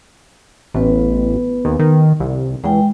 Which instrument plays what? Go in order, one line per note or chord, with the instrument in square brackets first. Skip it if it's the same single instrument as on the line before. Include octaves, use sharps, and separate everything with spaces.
[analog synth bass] A1 [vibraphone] B3 B4
[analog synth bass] D#2
D#3
C2
[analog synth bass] E2 [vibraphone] G#3 G5